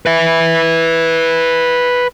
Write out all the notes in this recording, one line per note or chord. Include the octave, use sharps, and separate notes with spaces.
B4 E5